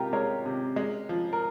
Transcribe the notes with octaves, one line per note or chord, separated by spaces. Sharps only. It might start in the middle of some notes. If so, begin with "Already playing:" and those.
Already playing: C3 G#3 F4 G4 A#4
G#3 A#4 C#5
C3
G#3
F3
A#4